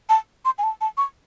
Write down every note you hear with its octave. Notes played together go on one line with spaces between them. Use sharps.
A5
C6
G#5
A5
A5
C#6